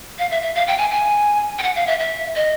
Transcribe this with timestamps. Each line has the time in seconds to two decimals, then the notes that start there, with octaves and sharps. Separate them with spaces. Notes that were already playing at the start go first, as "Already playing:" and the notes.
0.19 F5
0.31 E5
0.42 E5
0.55 F5
0.67 G5
0.78 G#5
0.90 G#5
1.59 G5
1.63 F#5
1.76 F5
1.87 E5
1.99 E5
2.36 D#5